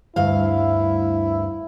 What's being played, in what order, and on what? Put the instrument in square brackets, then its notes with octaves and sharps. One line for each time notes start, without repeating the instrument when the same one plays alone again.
[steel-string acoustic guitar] D2 G2 F5 [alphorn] E4